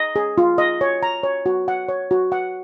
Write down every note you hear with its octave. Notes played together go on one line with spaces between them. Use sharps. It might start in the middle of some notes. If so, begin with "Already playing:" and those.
Already playing: D#5
G#4
F4
D#5
C#5
A#5
C#5
F#4
F#5
C#5
F#4
F#5